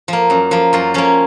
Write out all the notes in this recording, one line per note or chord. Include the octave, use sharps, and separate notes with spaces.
F3 A#3
F#2
F3 A#3
F#2 F4
F3 A#3 C#4